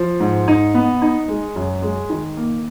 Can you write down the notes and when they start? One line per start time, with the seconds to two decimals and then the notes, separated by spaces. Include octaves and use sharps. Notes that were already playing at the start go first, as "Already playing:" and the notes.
Already playing: F3
0.20 G#2
0.48 D#4
0.74 B3
1.02 D#4
1.28 G#3
1.56 F#2
1.82 G#3
2.10 D#3
2.37 A#3